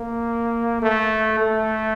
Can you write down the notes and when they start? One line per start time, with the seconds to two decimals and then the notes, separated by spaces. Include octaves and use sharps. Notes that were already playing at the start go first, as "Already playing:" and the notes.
Already playing: A#3
0.82 A3
1.40 A3